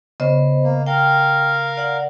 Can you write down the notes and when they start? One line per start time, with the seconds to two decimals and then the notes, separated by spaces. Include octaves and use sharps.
0.20 C#3 B3 C5 D#5
0.63 A#3
0.86 A#4 F5 G5
1.77 D5 F#5